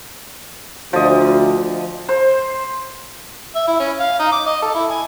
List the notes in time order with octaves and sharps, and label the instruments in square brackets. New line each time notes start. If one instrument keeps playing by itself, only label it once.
[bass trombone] D2 [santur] F3 D#5
[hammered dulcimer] C5
[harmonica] E5
E4
C#4
F5
D#4
D6
D#5
A4
E4
G#5